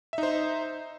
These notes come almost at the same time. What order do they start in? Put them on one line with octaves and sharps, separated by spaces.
E5 D#4 C5